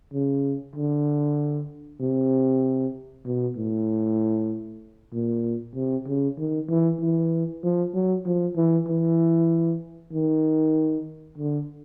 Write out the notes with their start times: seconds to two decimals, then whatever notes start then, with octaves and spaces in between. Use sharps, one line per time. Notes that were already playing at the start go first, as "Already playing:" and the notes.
0.13 C#3
0.76 D3
2.00 C3
3.25 B2
3.56 A2
5.13 A#2
5.75 C3
6.06 C#3
6.38 D#3
6.69 E3
7.00 E3
7.63 F3
7.94 F#3
8.25 F3
8.56 E3
8.88 E3
10.12 D#3
11.38 D3